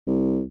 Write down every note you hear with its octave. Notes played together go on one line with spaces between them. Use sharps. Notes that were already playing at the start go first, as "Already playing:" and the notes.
C2